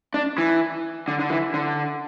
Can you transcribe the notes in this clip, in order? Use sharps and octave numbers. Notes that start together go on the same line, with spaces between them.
D4
E3
D3
D3
E3
D3